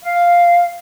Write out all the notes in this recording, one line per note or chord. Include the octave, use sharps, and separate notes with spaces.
F5